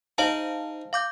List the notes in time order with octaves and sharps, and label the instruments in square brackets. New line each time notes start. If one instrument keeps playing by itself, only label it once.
[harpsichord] D#4 G#4 [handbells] C5 F5 A5
[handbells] F5 D6 G6